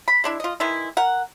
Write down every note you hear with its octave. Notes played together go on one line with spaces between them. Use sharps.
B5
G#3 D4 E4
F4 D#5
D#3 E3 G#3 E4
A#4 F#5